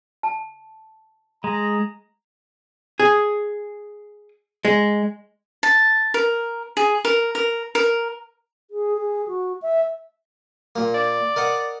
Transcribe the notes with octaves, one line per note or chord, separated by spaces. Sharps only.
A5
G#3 A#5
G#4
G#3
A5
A#4
G#4
A#4
A#4
A#4
G#4
G#4
F#4
E5
A#2 A#3
D5
A#4 D#5 F#5